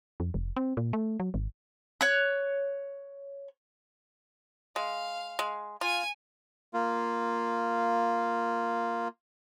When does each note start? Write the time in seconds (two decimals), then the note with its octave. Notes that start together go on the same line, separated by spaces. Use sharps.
0.20 F2
0.34 F1
0.56 C4
0.77 A#2
0.93 A3
1.20 F#3
1.34 G#1
2.01 C#5 F#6
4.76 G#3 F5
5.39 G#3
5.81 F4 G#5 G#6
6.74 A#3 F4